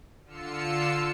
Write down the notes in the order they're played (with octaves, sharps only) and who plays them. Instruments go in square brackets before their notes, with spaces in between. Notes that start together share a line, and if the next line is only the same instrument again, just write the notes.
[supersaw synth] D3 F4 E6 C7 C#7